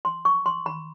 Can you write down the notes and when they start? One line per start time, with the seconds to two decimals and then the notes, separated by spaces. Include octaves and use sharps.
0.05 C6
0.25 C#6
0.46 C6
0.66 B5